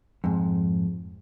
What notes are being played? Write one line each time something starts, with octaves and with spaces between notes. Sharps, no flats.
F2 G#2